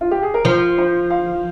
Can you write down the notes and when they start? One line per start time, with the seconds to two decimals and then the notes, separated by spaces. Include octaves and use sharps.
0.01 F4
0.11 G4
0.23 G#4
0.34 A#4
0.45 F3 C5
0.78 C5
1.10 F5